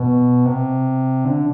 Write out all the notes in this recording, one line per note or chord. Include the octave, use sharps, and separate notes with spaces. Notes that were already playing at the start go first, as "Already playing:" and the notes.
Already playing: B2
C3
D3